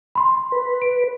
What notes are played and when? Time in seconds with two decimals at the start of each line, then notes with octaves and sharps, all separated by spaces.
0.15 B5 C6
0.52 B4
0.82 D7